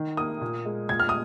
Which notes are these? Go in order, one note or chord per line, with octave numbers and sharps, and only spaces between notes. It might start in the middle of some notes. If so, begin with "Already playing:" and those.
Already playing: D#3
A#3 D#6
A#2
G#3
A#2 G#6
F6
D#6